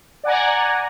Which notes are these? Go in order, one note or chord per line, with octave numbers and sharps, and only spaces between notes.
D5 F#5 G#5 A#5